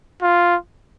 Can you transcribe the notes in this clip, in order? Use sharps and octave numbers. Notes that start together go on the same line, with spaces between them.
F4